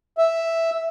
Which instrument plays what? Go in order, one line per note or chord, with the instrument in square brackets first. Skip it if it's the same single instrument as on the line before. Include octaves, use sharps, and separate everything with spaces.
[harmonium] E5